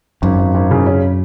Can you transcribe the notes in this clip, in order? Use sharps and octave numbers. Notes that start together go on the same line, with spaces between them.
G#1 F#2
G#1
G#1
C#3
C#4